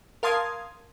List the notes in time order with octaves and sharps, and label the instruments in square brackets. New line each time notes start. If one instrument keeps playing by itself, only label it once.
[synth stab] A#4 F5 A5 C6 D#6 G#6